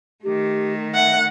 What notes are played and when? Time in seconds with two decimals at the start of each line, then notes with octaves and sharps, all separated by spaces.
0.24 D#3 A3 G4
0.95 E5 F#5